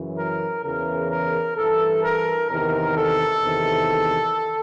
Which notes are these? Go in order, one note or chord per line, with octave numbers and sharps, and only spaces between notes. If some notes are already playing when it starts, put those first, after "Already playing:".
Already playing: F#2 C#3 E3
A#4
E2 C#3 E3 A#4
A#4
G2 E3 A4
A#4
E2 C3 D#3 A#4
A4
E2 C3 D#3